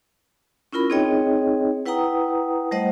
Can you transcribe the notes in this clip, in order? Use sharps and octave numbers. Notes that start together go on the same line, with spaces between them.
C#4 E4 F4 A#4 B5
C4 D#4 G#4 C#5 D#5 G5
E4 B4 F#5 G5 A#5 D#6
G3 A3 C5 D#5 F#5